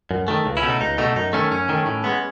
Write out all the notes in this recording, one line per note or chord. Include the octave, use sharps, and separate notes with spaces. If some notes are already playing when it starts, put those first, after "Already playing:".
F#2
D#3 A3
C#2
C#4 E4
B2 A3
D#4
C#2 D#4
B2 A3 D#4
F#2 D#4
D#3 A3 C#4
F#2 C#4
D#3 A3
A2
G#3 B3